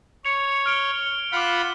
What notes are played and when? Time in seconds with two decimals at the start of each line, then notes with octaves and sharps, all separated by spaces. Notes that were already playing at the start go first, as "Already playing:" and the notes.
0.25 C#5 C#7 F7
0.66 F6 D7 G7
1.32 F4 F#5 B5 D6 F6